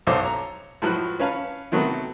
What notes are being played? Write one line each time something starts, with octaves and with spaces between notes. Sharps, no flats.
B1 F#4 A4 C5 C#5 D6
C#5 A#5
A2 F3 F#3 B4 F#6
C#4 B4 C#5 F5 A5
C3 D#3 F#3 A3 B3